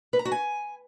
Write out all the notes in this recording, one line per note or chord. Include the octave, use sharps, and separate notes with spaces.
B4
A#5
F#4
G#5